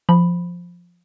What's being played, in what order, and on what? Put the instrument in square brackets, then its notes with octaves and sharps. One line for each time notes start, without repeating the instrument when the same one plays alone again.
[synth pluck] F3 B5